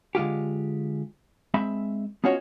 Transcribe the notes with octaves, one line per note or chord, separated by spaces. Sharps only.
D3 G#3 F4 G4
G#3 C4 E5 B5
B3 C#4 F4 F#4 C#5 D#5